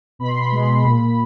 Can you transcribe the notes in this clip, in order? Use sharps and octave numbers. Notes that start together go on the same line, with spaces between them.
B2 B5
C6
B5
G#3
A#2